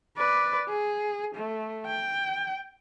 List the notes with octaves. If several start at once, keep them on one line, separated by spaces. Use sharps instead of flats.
B4 D5
G#4
A3
G5